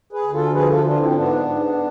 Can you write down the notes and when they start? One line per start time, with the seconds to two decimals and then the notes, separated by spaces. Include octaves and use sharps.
0.13 G#4 B4
0.23 D2
0.33 F4 A4
0.53 F3 G#4 B4
0.69 F4 A4
0.84 D3 D4 F4
1.00 C4 E4
1.10 E4
1.15 G#2 B3 D4
1.46 G#2